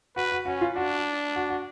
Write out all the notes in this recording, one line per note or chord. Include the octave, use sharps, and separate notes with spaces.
F#4 B4
F#4
C#4 F#4
F4
D4 F#4
F#4
F#4